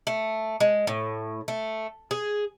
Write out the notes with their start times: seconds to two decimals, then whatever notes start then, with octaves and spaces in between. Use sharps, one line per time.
0.07 A3
0.60 G#3
0.87 A2
1.48 A3
2.11 G#4